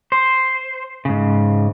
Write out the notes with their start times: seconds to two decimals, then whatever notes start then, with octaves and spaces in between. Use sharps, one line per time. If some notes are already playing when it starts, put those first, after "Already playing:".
0.12 C5
1.05 G#2 C#3